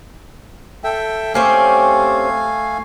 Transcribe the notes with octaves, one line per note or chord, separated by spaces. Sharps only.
A4 E5 G5
A3 C4 C#4 G4 F5 G#5